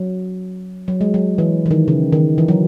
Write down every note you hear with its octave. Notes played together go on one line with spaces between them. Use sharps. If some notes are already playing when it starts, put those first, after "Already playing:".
Already playing: F#3
F#3
G#3
F#3
E3
E3
D#3
C#3
D#3
E3
F#3